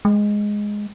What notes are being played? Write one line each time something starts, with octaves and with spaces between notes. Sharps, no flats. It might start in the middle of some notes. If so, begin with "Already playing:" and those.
G#3